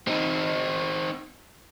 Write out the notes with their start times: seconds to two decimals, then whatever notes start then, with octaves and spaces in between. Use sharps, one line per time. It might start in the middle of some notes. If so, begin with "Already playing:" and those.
0.08 C4 D#4